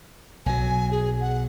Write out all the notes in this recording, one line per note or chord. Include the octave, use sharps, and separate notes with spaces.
B1 F#3 G#5
G#4
F#5